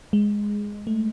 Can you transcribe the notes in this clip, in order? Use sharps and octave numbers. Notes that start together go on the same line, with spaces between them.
G#3
A3